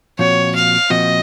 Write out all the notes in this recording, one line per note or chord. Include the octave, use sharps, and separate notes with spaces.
A#2 F3 C4 F#4 C#5
F5
A#2 F3 C4 F#4 D#5